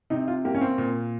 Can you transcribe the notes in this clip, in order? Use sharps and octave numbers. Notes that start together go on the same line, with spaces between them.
C3 D#4
F4
A#3 G4
C#4
C4
A#2